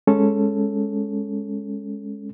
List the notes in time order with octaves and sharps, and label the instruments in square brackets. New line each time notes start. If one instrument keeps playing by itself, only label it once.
[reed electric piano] G#3 C#4 A4